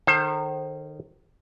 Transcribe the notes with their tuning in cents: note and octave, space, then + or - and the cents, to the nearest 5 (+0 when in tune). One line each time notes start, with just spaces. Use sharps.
D#3 -25 A4 +0 C5 +25